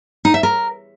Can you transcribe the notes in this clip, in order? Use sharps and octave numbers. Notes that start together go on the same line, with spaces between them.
D#4
E5
A#4